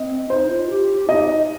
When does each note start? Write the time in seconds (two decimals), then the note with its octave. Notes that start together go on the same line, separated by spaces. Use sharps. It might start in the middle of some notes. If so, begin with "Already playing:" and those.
Already playing: C4 D#5
0.29 D#4 C5
0.49 F4
0.70 G4
1.09 D#4 D#5